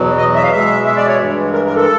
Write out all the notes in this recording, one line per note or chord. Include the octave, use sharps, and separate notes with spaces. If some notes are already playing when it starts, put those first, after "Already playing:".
Already playing: E2 B2 F#3
D#5
E5
F5
B2 G#3 E5
E5
D5
C#5
G2 E3 G#3
A#4
A#4
A4